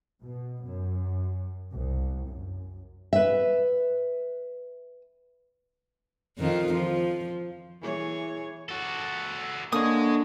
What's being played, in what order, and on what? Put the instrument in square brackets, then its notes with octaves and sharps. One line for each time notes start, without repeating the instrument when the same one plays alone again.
[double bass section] B2
F#2
C2
F#2
[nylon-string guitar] B4 E5
[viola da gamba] F2 D#3 F4
F3
E3 G#4 C#5
[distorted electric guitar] F#4 A4
[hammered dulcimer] D3 C#5 [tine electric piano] A#3 [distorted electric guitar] D#5 G#5 [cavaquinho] D#6